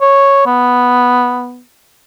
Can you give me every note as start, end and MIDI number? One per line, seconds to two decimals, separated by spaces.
0.01 0.42 73
0.46 1.61 59